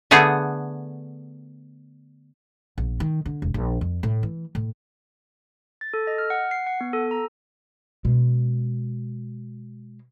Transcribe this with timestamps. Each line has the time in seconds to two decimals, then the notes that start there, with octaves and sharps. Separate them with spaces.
0.11 D3 A3 B3 G#4
2.78 A#1
3.00 D#3
3.26 D3
3.42 E1
3.54 A#1
3.81 F2
4.03 A2
4.23 E3
4.55 A2
5.81 A6
5.94 A4
6.07 D#5
6.18 F6
6.30 F#5
6.51 C7
6.67 F#5
6.81 B3
6.93 A4
7.11 A#5
8.05 B2 G#3